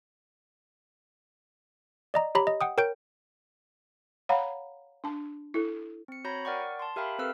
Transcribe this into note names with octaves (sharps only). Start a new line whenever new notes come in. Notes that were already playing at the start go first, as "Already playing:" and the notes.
D5 D#5 A#5
G4 C#5 A#5 B5
D#5
F#5 G5 D#6
A#4 C#5 G5 G6 D7
C#5 F5 F#5 A#5 B5
D4 A5
E4 A4
C4 C#7
F#4 C#5 A#5 B5 G6 A#6
A#4 D5 F#5 G5 C#6
A5 C6
G4 A#4 E5 F5 G5 B5
C4 A4 B4 F5 E6 F6